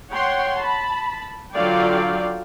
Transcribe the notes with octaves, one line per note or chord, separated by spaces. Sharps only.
C#5 F#5 G5 C6
A5 B5
D3 F#3 F4 D5 F5 G5